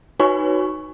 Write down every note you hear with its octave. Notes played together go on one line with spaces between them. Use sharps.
D#4 F#4 B4 C#5 G#5 C#6